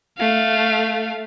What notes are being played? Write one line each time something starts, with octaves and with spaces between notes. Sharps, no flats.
A3 F5